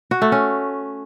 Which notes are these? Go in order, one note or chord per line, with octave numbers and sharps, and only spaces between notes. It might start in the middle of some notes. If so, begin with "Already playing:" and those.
F#4
A3
C#4